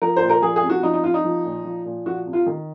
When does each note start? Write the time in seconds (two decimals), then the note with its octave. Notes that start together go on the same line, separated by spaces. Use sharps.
0.02 F3 A#4
0.17 C5
0.22 A#2
0.29 A#4
0.42 F3 G#4
0.56 G#4
0.63 C3
0.70 F#4
0.83 F3 D#4
0.94 D#4
1.04 C3 F4
1.14 D#4
1.24 F3
1.45 A#2
1.65 F3
1.85 A#2
2.06 F3 F#4
2.26 C3
2.33 F4
2.46 D#3